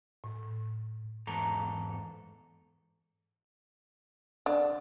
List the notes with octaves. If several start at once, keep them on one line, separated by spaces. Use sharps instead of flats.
A2
E2 G#2 A4 A#5
D3 D4